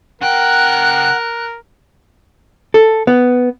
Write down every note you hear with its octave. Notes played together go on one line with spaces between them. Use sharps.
C#3 A#4 F#5 G5 F#6
A4
B3